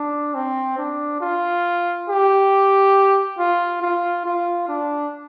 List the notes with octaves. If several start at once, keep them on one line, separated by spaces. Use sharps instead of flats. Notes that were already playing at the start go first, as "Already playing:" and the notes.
Already playing: D4
C4
D4
F4
G4
F4
F4
F4
D4